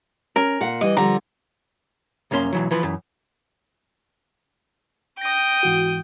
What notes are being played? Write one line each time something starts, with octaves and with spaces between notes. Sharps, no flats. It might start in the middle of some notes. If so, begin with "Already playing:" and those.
C#4 A#4
A#2 F5 F#5
E3 G3 D#5
D3 F3 G3 A#5
C2 F#2 A#3 C#4 C6
B1 E3 F#3
E3 F3 B4
F#2 E3
G5 D#6 A#6
G#2 E3 F#4